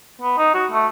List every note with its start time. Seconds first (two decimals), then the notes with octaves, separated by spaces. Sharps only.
0.21 B3
0.38 D#4
0.54 F#4
0.71 A3